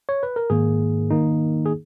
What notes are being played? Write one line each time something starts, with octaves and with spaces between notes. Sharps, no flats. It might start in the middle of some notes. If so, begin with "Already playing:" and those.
C#5
B4
A#4
G#2 D#3 A#3 G#4
D#3 A#3 D#4
G#4